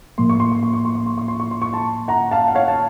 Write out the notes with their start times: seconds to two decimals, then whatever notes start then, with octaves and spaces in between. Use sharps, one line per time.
0.18 A2 F3 A#3 C6
0.29 C#6
0.40 C6
0.52 C#6
0.63 C6
0.74 C#6
0.85 C6
0.95 C#6
1.06 C6
1.18 C#6
1.28 C6
1.40 C#6
1.51 C6
1.62 C#6
1.73 A5 C6
2.08 F#5 A#5
2.31 F5 A5
2.48 F#5
2.55 C#5 F5
2.68 A5